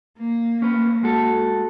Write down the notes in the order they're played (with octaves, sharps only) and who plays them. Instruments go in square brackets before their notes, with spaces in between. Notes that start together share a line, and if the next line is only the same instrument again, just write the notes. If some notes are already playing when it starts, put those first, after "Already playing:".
[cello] A#3
[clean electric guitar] C#4 B4
G#3 F#4 A4